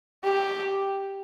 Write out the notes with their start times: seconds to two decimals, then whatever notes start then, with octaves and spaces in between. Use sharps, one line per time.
0.24 G4